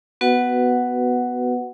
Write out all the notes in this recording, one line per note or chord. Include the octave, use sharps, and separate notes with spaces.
B3 F#4 B4 F#5